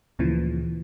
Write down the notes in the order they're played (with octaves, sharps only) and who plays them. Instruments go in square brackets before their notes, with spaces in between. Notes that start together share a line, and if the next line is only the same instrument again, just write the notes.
[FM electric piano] D2 A#2 C#3 E3 F3